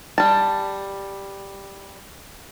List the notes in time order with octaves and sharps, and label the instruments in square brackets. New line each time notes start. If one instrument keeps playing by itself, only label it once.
[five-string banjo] G3 A5